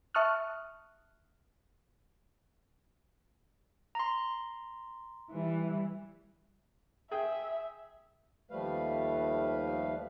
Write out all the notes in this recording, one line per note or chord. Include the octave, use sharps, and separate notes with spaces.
E5 A5 C#6 D#6 F6 F#6
A#5 C6
E3 G3
G#4 E5 G5
D#2 F3 G3 A3 B4 F5